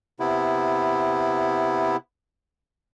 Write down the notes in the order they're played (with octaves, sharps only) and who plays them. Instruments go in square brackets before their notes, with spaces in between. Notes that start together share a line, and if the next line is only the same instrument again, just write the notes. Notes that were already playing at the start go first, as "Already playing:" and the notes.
[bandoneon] C3 B3 E4